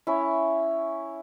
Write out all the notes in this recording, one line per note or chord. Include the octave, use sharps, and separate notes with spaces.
C#4 E4